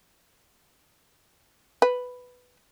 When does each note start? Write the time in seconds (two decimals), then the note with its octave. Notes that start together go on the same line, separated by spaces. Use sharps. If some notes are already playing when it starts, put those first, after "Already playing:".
1.82 B4